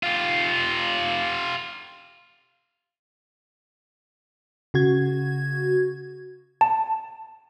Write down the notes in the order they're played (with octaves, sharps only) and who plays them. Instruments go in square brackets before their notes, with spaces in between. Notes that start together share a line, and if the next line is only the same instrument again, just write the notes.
[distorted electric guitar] F4 G4
[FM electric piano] C#3 F#4 G#6
[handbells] A5